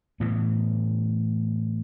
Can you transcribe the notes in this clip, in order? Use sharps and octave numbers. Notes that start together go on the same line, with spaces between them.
A2 E3 B3